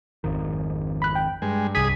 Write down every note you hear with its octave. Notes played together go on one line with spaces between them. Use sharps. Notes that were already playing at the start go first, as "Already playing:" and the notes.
G#1 F2 D#3
B5 F#6
G5
G2 G#3
C2 G#4 D#6 B6